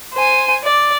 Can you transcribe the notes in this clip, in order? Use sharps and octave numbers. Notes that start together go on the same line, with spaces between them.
C5 G#5
D5